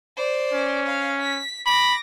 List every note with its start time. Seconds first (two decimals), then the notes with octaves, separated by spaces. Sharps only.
0.17 C5 D5
0.53 C#4
0.87 F5
1.21 B6
1.66 B5 D6 A#6